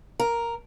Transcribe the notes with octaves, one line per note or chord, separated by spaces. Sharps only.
A#4